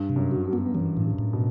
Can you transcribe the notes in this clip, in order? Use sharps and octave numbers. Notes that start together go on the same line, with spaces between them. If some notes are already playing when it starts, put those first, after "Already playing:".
Already playing: G2
C3
F#2
F#4
G2
B3
F#2 E3
A2
G2
A2
B2